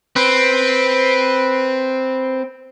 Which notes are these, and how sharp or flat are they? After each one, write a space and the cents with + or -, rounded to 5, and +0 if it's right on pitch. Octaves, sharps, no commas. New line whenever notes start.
C4 +0 B4 +0